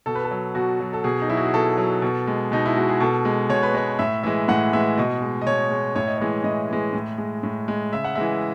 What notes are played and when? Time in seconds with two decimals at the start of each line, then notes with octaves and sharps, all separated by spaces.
0.06 B2 A4
0.15 B4
0.24 A4
0.31 F#3
0.55 B2 F#4
0.80 F#3
0.93 A4
1.04 B2 G#4
1.21 D#4
1.28 F#3 E4
1.37 F#4
1.45 G#4
1.54 B2 A4
1.77 F#3
2.02 B2
2.27 G#3
2.52 B2 D#4
2.66 E4
2.77 G#3 F#4
2.88 G#4
3.00 B2 A4
3.25 G#3
3.49 B2 C#5
3.63 B4
3.74 G#3 C#5
3.99 A2 E5
4.23 E3 G#3 E5
4.48 A2 F#5
4.73 E3 G#3 E5
4.98 B2 D#5
5.22 G#3
5.42 D#5
5.46 B2 C#5
5.71 G#3
5.96 A2 C#5
6.07 D#5
6.18 E3 G#3 C#5
6.44 A2 D#5
6.70 E3 G#3
6.93 A2
7.18 G#3
7.43 A2
7.68 G#3
7.92 C#3 E5
8.05 F#5
8.15 E3 G#3 E5